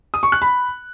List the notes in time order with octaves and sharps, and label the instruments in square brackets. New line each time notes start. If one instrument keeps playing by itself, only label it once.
[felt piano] D#6
C#6
F#6
B5